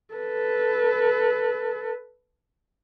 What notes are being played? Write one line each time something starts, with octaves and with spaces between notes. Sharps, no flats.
A4 B4